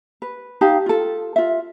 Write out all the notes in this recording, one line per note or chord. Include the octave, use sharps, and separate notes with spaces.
B4
D#4 G4 F5 A5
F4 A4
F4 E5